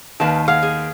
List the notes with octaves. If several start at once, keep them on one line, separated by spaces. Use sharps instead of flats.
D#2 D#3 B4 F5 A5
G#4 F5 F#5
G#4